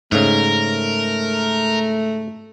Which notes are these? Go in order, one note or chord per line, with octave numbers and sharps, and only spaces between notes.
G#2 C#3 A3 A#4